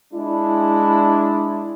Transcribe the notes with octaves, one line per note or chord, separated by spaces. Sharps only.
G#3 D4 E4